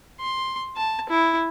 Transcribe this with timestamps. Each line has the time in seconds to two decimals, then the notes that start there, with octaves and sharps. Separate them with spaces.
0.20 C6
0.76 A5
1.09 E4